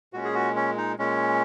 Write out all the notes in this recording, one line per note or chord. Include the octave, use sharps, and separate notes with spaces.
A#2 G#3 C#4 F#4
G#4
F#4
C#4
D#4
A#2 G#3 C#4